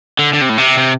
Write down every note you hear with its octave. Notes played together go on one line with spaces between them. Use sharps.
D3
D3
C3
A2
C3
C3